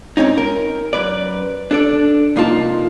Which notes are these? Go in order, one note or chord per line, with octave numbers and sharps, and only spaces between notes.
G#2 C4 C#4 D#4
A#4
F#2 B4 D5
D4 A4 D5
C2 F2 A#3 D#4 F4 A5